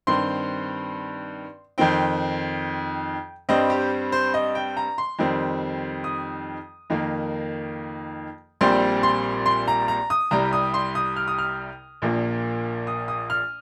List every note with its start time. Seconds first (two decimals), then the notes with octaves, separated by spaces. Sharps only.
0.07 G2 D#3 C4 C6
1.78 F2 D#3 C4 G5
3.49 G2 G3 C4 D#5
3.70 G4
4.12 C5
4.34 D#5
4.55 G5
4.77 A#5
4.98 C6
5.19 F2 D#3 G3 C4
6.04 D#6
6.90 F2 D#3 A#3
8.61 A#1 A#2 G3 C4 C6
9.03 C6
9.46 C6
9.68 A#5
9.88 A#5
10.10 D#6
10.31 C2 C3 G3 A#5
10.53 D#6
10.74 C6
10.95 D#6
11.16 F6
11.28 D#6
11.38 F6
12.02 A#1 A#2 F3 A#3
12.87 D#6
13.08 D#6
13.30 F6